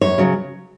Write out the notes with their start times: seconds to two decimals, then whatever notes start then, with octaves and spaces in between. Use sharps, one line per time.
0.01 F#2 C#5
0.18 C#3 F#3